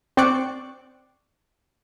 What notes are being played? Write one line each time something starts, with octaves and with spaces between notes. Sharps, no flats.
C4 C5 D5 C#6 D6 F#6